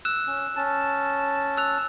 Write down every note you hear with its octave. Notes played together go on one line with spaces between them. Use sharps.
E6 F#6 E7
C#4
C#4 A5
E6 F#6 F7